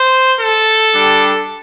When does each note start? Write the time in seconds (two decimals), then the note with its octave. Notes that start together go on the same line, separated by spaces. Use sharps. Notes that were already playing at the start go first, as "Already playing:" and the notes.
Already playing: C5
0.38 A4
0.94 G3 D4 G4